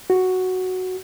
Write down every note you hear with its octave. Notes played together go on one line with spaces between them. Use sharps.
F#4